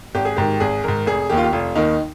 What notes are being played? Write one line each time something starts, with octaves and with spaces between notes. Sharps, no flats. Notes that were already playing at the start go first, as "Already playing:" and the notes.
G#1 G4
G#4
G#2 D#3 G4
G#1 G#4
G#2 D#3 A#4
F1 G#4
D#2 D#3 G4
F4
G4
F1 F4
D#2 D#3 D#4